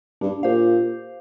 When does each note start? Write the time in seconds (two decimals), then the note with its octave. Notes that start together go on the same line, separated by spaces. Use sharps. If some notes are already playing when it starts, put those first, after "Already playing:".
0.21 G2 D4
0.43 A#2 G4 C5 F5